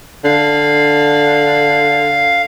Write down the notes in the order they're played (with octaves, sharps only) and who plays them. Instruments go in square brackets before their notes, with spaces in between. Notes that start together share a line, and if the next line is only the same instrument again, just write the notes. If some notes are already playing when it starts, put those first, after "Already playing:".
[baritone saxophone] D3 [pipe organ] F5